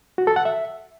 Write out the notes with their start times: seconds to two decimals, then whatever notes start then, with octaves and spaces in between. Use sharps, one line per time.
0.18 F#4
0.27 A4
0.36 F#5
0.45 E5